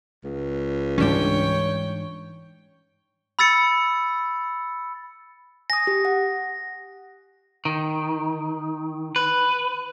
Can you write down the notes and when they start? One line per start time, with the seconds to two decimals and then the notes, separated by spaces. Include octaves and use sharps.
0.24 C#2
0.98 G#2 E3 G3 C#4 D4 C#5 G5
3.39 B5 E6 A6 C#7
5.70 G#5 D#6 A#6
5.87 G4
6.05 F#5
7.65 D#3
9.16 B4